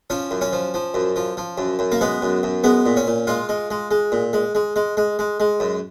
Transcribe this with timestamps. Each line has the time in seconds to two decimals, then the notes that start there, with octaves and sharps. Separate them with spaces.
0.10 F3 C#4
0.31 F#2
0.41 C#4
0.52 F3
0.74 F3
0.94 F#2
1.16 F3
1.37 F3
1.58 F#2
1.79 F#2
1.92 A#3
2.01 G#3 B3
2.22 F#2
2.43 F#2
2.64 G#3 B3
2.86 A#2
2.97 C#4
3.07 A#2
3.27 G#3 F4
3.49 G#3
3.71 G#3
3.91 G#3
4.12 A#2
4.33 G#3
4.55 G#3
4.76 G#3
4.97 G#3
5.19 G#3
5.40 G#3
5.60 F#2